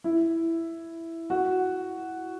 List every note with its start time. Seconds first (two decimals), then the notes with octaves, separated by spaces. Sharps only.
0.04 E4
1.30 F#4